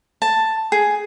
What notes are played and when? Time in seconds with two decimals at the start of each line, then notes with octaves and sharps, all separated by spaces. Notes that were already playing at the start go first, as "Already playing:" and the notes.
0.22 A5
0.72 G#4